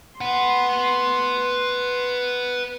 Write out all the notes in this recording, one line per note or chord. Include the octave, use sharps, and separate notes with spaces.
B4 F#5 C6